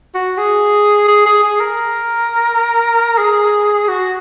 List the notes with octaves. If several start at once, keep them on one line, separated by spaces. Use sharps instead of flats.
F#4
G#4
G#4
G#4
G#4
A#4
G#4
F#4